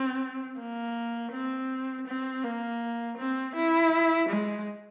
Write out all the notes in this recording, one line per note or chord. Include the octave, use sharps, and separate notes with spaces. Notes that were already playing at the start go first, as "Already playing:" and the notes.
Already playing: C4
A#3
C4
C4
A#3
C4
E4
G#3